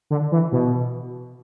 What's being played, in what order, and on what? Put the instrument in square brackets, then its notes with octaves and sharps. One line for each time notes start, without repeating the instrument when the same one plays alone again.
[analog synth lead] D3
E3
B2